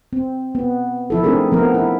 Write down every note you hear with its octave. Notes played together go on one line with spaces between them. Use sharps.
C4
B3
F3 E4 A4
A3 C4 D4 D#4 G#4 A#4
F3 B3 A#4
E4